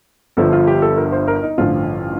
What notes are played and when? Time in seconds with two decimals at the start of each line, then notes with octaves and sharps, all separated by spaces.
0.37 G1 G2 D3 F3 A4
0.53 F4
0.67 G4
0.82 A4
0.98 A#4
1.12 C5
1.28 A#4
1.43 D#4
1.58 A1 G2 D3 F3 F4